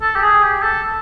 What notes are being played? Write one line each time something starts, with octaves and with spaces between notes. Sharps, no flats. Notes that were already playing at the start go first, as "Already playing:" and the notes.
A4
G4
G#4
G4
A4